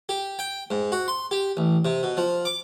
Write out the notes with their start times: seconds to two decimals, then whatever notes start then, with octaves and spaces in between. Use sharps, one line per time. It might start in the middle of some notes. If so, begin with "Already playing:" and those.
0.09 G4
0.39 G5
0.71 G#2
0.92 F#4
1.08 C6
1.31 G4
1.57 A1
1.85 C3
2.03 B2
2.17 F3
2.45 D6